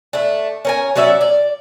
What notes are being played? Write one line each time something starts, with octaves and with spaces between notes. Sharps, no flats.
A3 D4
C#4 A#4 G#5
F#3 C#4 D5 E5
D5